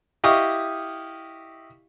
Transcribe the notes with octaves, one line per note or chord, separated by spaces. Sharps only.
E4 G4 D#5 F5 C#6 D#6